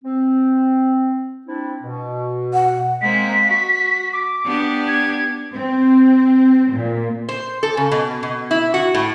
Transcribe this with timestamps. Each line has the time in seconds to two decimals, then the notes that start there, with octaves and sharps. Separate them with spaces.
0.04 C4
1.47 C4 D4 E4
1.83 B2
2.54 F#5
3.01 G#3 A#3 C4 B6
3.47 F#4
4.13 D6
4.46 B3 D4 G4
4.88 G#6
5.53 C4
6.72 A#2
7.29 C5
7.63 A4
7.77 C#3
7.91 B2
8.23 B2
8.51 E4
8.74 F#4
8.94 A2